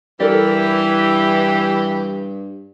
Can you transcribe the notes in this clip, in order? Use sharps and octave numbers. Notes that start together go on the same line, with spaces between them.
G2 E3 G4 A4 A#4 D5